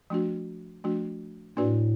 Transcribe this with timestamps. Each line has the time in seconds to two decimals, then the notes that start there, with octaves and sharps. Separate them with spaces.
0.10 F3 A3 D4 F#4
0.84 F3 A3 D4 F#4
1.57 A2 A#3 D4 F#4 B4 D5